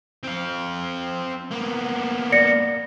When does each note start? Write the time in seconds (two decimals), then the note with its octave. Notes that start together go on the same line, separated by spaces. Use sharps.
0.23 C4 F5
1.51 A#3 B3
2.32 D5 A#6 C#7